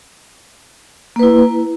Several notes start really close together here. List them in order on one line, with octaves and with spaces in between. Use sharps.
A#3 B4 E4